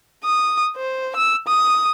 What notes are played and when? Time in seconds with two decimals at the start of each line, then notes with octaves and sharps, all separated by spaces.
0.25 D#6
0.76 C5
1.16 E6
1.48 D#6